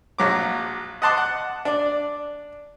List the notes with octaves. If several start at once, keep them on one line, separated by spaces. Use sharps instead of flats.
A#1 F#3 D6
D#5 F#5 A5 C6 D6
F#5
D4 D5